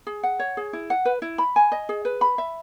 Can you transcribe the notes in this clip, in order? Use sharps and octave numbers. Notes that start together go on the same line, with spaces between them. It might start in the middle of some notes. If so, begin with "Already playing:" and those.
G#4
F#5
C#5
G#4
E4
F#5
B4
E4
B5
G#5
D#5
G#4
B4
B5
E5